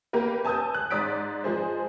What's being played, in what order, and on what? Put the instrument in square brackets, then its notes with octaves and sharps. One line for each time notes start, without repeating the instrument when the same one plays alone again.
[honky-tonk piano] A#3 G4 A#4 B4
G#5 A5 D#6 E6 G6
F#6
G#2 D5 D#6 B6 D7
F3 G#3 G#4 C5